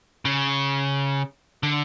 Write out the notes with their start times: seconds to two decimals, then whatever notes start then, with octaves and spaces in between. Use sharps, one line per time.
0.25 C#3
1.63 D3